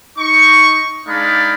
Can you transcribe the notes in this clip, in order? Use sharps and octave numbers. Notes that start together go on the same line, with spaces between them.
D#4 C#6
G#3 D4 D#4 D5 F5 B5